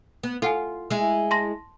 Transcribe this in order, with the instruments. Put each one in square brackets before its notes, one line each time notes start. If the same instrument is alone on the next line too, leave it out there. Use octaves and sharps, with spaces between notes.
[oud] B3
[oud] F4 [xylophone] A4 F#5 G#5
[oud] G#3 E4
[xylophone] A5 C6 A#6